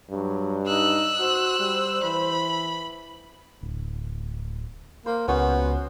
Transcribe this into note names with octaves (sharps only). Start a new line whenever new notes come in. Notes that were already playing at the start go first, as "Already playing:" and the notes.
G2 F#3
D#4 E6 F#6
F#4 C5
G3
E3 B5
D1
A#3 C5
C#2 B3 C#4 F#4 C5